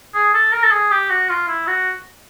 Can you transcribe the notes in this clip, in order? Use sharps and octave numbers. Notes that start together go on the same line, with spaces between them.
G#4
A4
A#4
A4
G#4
G4
F#4
F4
E4
F#4